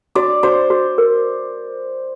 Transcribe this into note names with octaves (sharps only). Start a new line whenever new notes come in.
F#4 D5
F#4 C5
F#4
A#4